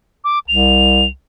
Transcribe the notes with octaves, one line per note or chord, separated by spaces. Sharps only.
D6
C2 F7